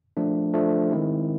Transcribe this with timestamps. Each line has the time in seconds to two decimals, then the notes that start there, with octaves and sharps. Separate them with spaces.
0.17 F3 A3 D4
0.54 F3 A3 D4
0.91 D#3 G#3 C4 E4